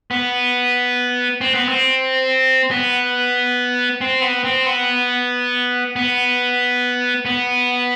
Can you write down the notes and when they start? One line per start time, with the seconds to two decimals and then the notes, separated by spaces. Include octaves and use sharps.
0.11 B3
1.41 C4
1.54 B3
1.69 C4
2.71 B3
4.01 C4
4.22 B3
4.44 C4
4.66 B3
5.96 B3
7.25 B3